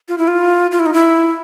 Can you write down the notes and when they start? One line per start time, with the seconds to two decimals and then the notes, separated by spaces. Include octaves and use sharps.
0.08 F4
0.18 E4
0.28 F4
0.72 F4
0.79 E4
0.86 D#4
0.94 E4